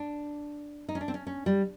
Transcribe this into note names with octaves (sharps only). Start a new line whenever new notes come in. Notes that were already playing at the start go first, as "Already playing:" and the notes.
Already playing: D4
D#4
C#4
D4
C4
C#4
C#4
G3